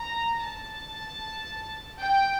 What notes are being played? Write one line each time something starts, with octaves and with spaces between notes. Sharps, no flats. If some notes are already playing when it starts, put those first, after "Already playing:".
Already playing: A#5
A5
G5